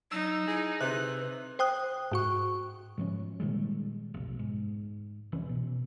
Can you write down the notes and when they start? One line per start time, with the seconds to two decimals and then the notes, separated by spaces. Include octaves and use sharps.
0.12 F#3 D#4 E6
0.48 E4 G#4
0.81 C3 B4 F#6
1.59 C5 G5 D#6 F#6
2.12 G#2 F#4 C#6
2.98 G#2 F3 C#4
3.40 A#2 D#3 G3 G#3
4.14 F1 B1
4.39 G#2
5.32 F1 C2 E3 C#4
5.49 B2